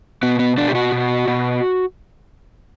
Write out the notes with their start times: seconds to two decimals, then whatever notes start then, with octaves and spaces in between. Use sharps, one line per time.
0.23 B2 B3
0.39 B3
0.57 B2 D4
0.68 G4
0.75 F#4
0.92 B2
1.28 B2